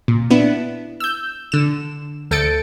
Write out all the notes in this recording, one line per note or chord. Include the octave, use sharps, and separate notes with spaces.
A#2
B3 D4 E4
E6 G6
D3 E7
D2 A4 G6 A6 C#7 D7